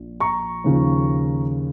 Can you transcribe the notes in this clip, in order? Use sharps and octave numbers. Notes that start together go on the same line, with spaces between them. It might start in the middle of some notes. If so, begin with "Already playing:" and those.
Already playing: A#1
A#5 C#6
D#2 C#3 F3